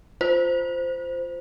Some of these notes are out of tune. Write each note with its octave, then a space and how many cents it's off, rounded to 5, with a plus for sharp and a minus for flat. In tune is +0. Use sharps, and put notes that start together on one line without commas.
F4 +0 C5 -10